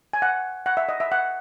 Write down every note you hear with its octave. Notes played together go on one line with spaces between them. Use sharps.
G#5
F#5
F#5
E5
D#5
E5
F#5